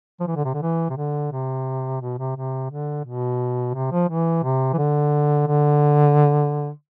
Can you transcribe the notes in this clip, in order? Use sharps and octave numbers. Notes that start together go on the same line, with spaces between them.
F3
E3
D3
C3
D3
E3
C3
D3
C3
B2
C3
C3
D3
B2
C3
F3
E3
C3
E3
D3
D3